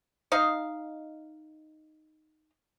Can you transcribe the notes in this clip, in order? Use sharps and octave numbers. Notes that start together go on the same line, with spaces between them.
D#4 D#5 F5